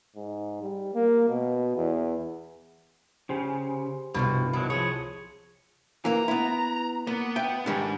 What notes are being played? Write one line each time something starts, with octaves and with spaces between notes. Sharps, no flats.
G#2
G3
A#3
B2
E2
C#3 G4 G#4 C5
C2 G2 B2 D3 F3
B2 D#3 F#3 E4 A5
F3 G#4 C#5
E3 A#3 A#5
B3 E4
A#3 B3
E5 G5
G#2 D#3 G3 D4